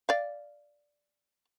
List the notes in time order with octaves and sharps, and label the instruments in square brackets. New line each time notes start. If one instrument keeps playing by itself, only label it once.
[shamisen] D5 F5